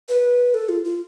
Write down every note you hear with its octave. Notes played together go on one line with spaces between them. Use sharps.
B4
A4
F4
F4